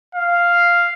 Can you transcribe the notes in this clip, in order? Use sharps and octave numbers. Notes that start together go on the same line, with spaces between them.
F5